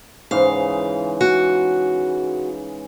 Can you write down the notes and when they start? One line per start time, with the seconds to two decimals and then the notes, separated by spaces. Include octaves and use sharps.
0.31 G#2 C#3 E3 F5
1.21 F#4